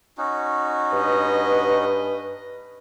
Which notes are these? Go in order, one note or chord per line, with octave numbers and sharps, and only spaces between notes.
C#4 D#4 F#4
G2 B4 D#5